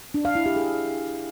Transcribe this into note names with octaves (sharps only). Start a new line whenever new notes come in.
D4
F5
E4
G4
G#4